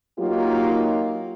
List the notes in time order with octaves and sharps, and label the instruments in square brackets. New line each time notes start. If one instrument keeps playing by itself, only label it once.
[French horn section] F#3 A#3 D#4 F4 G4